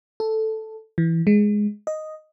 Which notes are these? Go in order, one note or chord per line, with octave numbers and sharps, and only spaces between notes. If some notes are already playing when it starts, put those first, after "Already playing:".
A4
E3
G#3
D#5